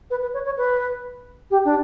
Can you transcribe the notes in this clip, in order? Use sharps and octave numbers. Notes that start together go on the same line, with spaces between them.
B4
B4
C#5
C#5
B4
G4
D4